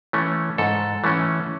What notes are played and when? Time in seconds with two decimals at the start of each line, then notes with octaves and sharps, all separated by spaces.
0.13 E3 A3 C#4
0.58 G#2 A4
1.04 E3 A3 C#4